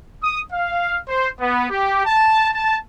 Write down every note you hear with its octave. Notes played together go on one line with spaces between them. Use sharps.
D#6
F5
C5
B3
G4
A5
A5